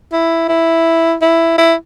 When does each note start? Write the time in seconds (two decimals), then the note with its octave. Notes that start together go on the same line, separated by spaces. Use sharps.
0.12 E4
0.49 E4
1.21 E4
1.58 E4